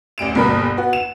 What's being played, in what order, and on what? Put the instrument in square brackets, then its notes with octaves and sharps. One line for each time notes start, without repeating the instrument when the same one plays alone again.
[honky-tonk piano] A1 D2 D7 E7
G1 D#2 B2 A#4 B5
B3 F#4
E7